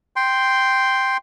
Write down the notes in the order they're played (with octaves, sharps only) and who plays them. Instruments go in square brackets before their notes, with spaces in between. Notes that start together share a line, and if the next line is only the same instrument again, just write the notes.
[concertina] G5 C6